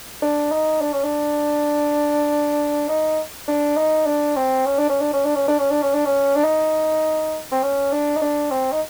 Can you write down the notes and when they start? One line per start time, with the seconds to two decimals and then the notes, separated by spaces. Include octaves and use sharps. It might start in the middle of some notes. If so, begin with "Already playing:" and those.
0.22 D4
0.52 D#4
0.81 D4
0.93 C#4
1.04 D4
2.89 D#4
3.48 D4
3.77 D#4
4.06 D4
4.36 C4
4.66 C#4
4.78 D4
4.89 C#4
5.01 D4
5.13 C#4
5.25 D4
5.35 C#4
5.48 D4
5.59 C#4
5.71 D4
5.82 C#4
5.94 D4
6.05 C#4
6.36 D4
6.44 D#4
7.52 C4
7.63 C#4
7.92 D4
8.17 D#4
8.22 D4
8.51 C4
8.72 D#4